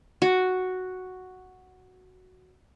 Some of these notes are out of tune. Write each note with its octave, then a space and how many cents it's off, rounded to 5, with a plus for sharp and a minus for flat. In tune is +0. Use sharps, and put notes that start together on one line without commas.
F#4 +0